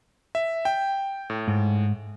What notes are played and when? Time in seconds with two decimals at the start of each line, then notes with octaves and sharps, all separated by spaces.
0.35 E5
0.65 G5
1.30 A2
1.48 G#2